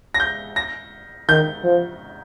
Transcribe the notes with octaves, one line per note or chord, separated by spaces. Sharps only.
A#6
G6
A#6
D#3 G6
F3